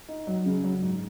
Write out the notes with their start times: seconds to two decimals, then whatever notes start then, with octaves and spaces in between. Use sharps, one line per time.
0.09 D#4
0.27 F#3
0.46 C#3
0.64 F#3
0.82 G#2